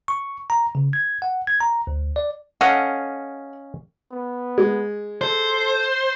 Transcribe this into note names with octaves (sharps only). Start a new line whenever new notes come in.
C#6
A#5
C#3
G#6
F#5
G#6
A#5
D2
D5
C#4 A4 D#5 F5 F#5
B3
G#3
A4 C5